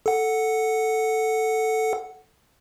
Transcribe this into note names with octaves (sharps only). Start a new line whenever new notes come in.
A4 F#5